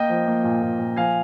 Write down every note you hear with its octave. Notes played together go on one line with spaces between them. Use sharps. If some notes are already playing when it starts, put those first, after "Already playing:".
Already playing: A#3 D#5 G5
F3
A#3
A#2
A#2
A#2
F3 F5 G#5